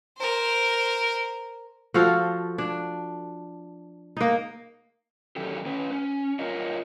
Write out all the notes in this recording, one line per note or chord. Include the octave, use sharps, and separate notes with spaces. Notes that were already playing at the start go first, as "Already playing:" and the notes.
A#4 C5
F3 F#4 A4 F5
D4
A#3 D#4
D#3 F#3 C#4 G4 A4
C#4 B4
C#4
F4 A#4 C#5 D#5